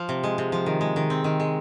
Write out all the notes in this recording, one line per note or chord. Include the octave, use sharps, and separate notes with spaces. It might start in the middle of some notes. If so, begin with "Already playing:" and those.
Already playing: F3
C3
G#3
C3
F3
D#3
G#3
D#3
C4
D#3
G#3